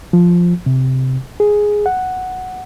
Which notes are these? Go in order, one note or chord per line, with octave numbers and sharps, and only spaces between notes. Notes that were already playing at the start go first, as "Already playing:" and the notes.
F3
C3
G#4
F#5